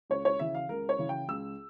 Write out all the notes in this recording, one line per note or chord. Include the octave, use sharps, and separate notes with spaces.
C#2 C#5
C#5
C#3 E3 E5
F5
C#2 A#4
C#5
C#3 E3
G5
C#2 E6